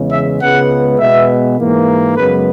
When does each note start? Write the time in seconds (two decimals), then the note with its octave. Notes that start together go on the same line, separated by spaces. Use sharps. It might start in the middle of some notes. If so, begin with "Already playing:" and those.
Already playing: E2 C#3 G#3
0.12 E5
0.42 C#2 C#3 G#3 B3 F#5
0.99 B2 G#3 B3 E5
1.58 G#2 E3 A#3
2.17 F#2 C#3 G#3 B3 B4